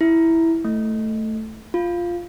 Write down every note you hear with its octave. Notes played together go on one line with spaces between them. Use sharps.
E4
A3
F4